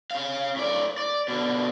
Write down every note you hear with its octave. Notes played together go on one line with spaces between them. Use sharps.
C#4 F5
A2 D5
D5
B2 D3